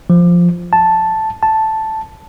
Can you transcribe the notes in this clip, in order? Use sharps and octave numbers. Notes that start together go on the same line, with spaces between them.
F3
A5
A5